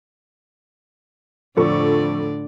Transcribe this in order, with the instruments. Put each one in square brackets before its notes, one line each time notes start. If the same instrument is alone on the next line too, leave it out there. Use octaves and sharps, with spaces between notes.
[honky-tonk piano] F2 A4 C#6 [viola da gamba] A2 D3 D5